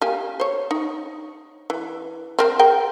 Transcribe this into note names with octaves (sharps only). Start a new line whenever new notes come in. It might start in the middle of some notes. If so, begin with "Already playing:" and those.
A#3 G4 G#5
C5 C#5
D#4
E3
C4 A#4 C5
G#4 A#4 G5